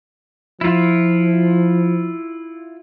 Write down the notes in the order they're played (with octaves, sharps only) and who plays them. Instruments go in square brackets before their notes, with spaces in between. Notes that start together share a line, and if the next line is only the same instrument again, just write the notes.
[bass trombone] F3 [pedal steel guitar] E4 F4